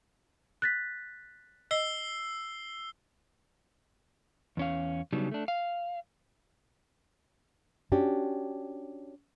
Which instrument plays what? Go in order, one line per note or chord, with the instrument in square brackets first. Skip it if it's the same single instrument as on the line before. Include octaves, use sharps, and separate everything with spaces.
[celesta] F#6 A6 B6
[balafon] D#5 [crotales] E6 C7 G7
[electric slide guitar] E2 C#4 F5
C#3 F#3 G3 B3 D4 D#4
A3 D4
F5
[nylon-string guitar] C#4 D4 F#4 G4